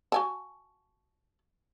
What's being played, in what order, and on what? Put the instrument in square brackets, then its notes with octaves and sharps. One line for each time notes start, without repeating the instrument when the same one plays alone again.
[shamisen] F#4 G#5 A5